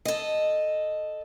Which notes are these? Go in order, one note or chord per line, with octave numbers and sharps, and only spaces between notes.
A4 D#5